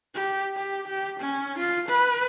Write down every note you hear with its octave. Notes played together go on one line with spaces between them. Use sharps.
G4
G4
G4
C#4
F4
B4